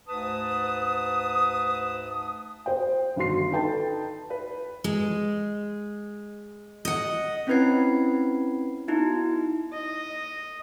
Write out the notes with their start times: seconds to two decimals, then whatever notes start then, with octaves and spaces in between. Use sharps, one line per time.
0.07 D2 G#2 B4 A5 D#6
2.66 C5 G5
3.16 G1 D#3 F#4 C6 C7
3.52 D#4 A4 B4 G5 A5
4.30 B4
4.84 G#3
6.85 D#5 F#5
7.47 C4 C#4 E4 B4 G#6 C7
8.88 B3 D#4 E4 F#4
9.73 D#5